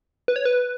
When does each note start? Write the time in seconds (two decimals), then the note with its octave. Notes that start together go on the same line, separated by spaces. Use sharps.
0.28 B4
0.36 C#5
0.45 B4